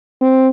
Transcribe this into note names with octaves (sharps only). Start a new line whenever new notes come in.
C4